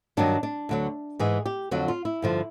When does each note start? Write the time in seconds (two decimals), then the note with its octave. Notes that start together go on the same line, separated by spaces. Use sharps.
0.17 G2 D#3 F#3 D4
0.43 D4
0.69 D2 D3 F#3
1.19 G#2 E3 G#4
1.46 G4
1.71 F2 D3 F#3 F#4
1.88 F4
2.05 E4
2.22 G2 D3 F3